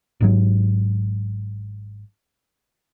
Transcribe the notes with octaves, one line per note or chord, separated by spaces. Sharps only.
G#1 G#2 F#3